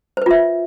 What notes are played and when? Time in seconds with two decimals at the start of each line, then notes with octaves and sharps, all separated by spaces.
0.17 C5
0.22 B4
0.26 F4
0.31 E5